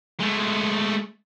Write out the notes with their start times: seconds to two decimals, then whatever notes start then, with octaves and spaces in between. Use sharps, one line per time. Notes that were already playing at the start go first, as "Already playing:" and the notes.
0.20 G#3 A3